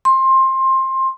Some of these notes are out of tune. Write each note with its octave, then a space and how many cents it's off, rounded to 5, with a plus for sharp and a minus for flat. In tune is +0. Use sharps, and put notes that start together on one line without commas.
C6 +20